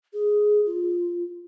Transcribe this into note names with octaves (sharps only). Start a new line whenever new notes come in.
G#4
F4